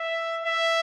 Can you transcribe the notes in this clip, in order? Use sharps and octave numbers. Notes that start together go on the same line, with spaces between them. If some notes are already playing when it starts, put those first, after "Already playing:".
Already playing: E5
E5